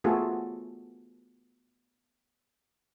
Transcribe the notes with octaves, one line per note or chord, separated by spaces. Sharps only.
A3 B3 F4 F#4 G#4 A4